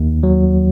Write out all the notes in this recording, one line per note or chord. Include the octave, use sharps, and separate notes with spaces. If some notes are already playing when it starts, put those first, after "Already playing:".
Already playing: D#2
F#3